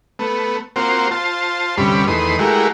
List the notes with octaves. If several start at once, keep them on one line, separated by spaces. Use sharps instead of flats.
A3 B3
A#3 C4 F4 F#4 C5
F4 C5 A5
D2 G2 C3 G3 C#4 B5
E2 D#3 A3 B4 C6 D#6
G#3 A3 E4 F#4 G4 A#4